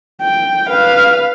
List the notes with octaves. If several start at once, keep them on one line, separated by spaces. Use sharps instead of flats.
G5
B4 F5